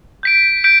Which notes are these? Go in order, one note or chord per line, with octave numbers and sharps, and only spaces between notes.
G6 B6 D7
G6 B6 D7